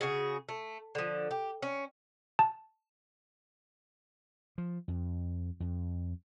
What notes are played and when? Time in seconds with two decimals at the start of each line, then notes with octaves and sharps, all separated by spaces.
0.01 C#3 F#4 G#4
0.49 A3
0.95 D3 F3
1.31 G4
1.62 C#4
2.39 A5
4.58 F3
4.88 F2
5.60 F2